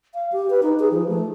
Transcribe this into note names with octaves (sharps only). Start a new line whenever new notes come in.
F5
G4
B4
D#4
G#4
F3
A3